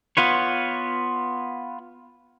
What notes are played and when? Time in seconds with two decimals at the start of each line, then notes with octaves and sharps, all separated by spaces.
0.17 B3 F4 B4 C#5